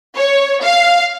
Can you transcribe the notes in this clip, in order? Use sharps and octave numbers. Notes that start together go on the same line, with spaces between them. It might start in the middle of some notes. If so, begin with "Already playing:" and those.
C#5
F5